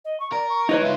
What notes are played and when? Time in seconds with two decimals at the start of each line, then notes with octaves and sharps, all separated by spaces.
0.05 D#5
0.20 C#6
0.32 A#4 D5
0.49 C#6
0.69 E3 D#4 B4 C#5
0.81 G#2 F4 E5